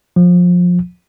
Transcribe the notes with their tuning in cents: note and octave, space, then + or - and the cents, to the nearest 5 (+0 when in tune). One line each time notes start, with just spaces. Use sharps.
F3 +25